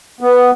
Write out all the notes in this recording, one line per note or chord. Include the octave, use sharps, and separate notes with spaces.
B3